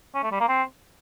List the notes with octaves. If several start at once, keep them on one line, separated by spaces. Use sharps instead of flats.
C#4
A3
G3
A#3
C4